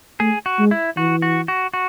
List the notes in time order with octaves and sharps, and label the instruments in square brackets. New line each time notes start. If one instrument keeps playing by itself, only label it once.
[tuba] A3 [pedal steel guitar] G#4
[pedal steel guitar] F#4
[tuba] G#3
[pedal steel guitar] E4
[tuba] E3 [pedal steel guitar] F#4
[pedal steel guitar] F#4
F#4
F#4